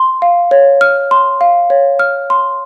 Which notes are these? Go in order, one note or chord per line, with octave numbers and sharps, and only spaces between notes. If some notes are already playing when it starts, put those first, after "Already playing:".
Already playing: C6
F5
C#5
F6
C6
F5
C#5
F6
C6